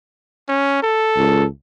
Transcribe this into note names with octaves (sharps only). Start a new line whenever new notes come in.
C#4
A4
C#2